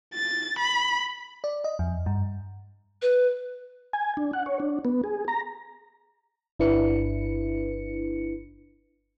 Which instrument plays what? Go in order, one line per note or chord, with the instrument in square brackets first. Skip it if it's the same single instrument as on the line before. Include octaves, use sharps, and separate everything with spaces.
[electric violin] A6
B5
[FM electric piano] D5
D#5
F2
G2
[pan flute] B4
[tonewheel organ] G#5
D4
F#5
C#5
D4
B3
G#4
A#5
[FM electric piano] G1 D4 E4 B4 C#7